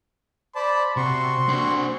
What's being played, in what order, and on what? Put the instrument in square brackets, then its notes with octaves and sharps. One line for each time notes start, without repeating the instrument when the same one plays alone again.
[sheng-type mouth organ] C5 D5 A5 [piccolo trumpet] B5
[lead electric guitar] C3 [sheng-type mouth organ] C4 F#4 C#6 [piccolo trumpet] C6
[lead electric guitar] D4 C5